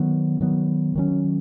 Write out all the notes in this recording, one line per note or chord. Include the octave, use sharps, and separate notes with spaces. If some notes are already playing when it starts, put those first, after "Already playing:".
Already playing: D#3 F#3 B3
D#3 F#3 B3
D#3 F#3 C#4